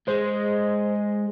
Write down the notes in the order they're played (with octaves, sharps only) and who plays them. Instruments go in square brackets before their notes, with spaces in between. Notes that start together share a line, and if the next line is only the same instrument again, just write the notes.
[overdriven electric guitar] G#3 [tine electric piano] C5